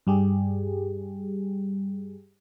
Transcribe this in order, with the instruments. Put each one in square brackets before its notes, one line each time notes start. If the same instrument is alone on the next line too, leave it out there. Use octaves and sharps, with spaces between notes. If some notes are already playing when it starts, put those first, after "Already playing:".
[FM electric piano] G2 G3 G4 G#4